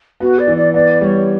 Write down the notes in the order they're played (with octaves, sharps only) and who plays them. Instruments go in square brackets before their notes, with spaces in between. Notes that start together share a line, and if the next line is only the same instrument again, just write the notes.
[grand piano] B3 [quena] F#4
[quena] D5
[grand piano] E3
[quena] D5
[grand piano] B3 [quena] D5
[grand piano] G3 [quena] C#5 D5